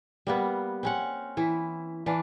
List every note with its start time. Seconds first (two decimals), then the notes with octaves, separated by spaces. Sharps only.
0.27 G3 A#3 B3
0.83 C4 C#4 F#5
1.37 E3 E4
2.06 E3 D4 F5